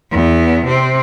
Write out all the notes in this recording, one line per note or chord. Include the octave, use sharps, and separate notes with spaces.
E2 B3
C3 C4